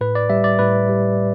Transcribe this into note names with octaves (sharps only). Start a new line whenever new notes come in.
A2 B4
D5
G3 E5
D5
A2 B4
G3